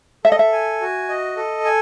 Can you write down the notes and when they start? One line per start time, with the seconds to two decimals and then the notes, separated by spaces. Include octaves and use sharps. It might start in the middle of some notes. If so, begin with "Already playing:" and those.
0.25 A4 E5
0.32 D#5
0.39 E5
0.52 G#5
0.81 F#4
1.09 D#5
1.37 A4
1.65 G#5